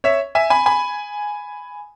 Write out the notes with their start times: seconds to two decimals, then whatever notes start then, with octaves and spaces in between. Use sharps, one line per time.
0.04 C#5 E5
0.35 E5 G#5
0.50 G#5 B5
0.66 G#5 B5